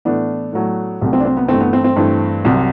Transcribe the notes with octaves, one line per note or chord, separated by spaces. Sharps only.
A2 E3 A3 B3 D4
A2 F#3 A3
C2 C3 F#3 A3
C4
D4
C4
B3
G2 E3 A3 C4
B3
C4
C4
G2 E3 A3
C2 C3 F#3